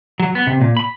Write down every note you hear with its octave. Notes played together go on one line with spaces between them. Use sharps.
F#3
B3
C3
A#2
B5